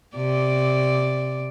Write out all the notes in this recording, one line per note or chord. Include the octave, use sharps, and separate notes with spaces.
C3 D5